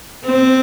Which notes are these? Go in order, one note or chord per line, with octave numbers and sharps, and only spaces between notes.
C4